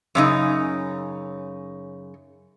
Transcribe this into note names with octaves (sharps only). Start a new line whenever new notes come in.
F#2 C#3 D#4